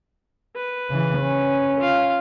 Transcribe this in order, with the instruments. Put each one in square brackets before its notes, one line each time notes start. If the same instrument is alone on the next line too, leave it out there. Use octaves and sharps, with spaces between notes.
[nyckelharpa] B4
[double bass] C#3 E3
C#4
[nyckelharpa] F4 F5